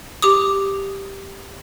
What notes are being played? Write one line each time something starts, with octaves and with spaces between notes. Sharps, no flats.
G4 D6 D#6